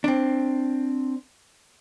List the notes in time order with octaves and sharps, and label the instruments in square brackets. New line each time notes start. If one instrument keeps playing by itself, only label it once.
[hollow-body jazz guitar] C4 D4